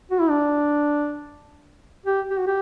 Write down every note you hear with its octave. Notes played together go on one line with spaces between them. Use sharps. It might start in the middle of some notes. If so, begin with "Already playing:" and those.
F#4
E4
D4
G4
G4
F#4
G4